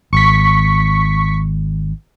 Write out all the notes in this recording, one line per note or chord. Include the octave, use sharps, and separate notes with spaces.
G#1 C#6 B6